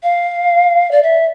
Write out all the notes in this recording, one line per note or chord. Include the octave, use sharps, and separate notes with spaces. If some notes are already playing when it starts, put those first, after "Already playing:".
F5
D5
E5